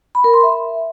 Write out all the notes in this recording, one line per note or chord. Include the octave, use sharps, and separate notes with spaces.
B5
A#4
C6
E5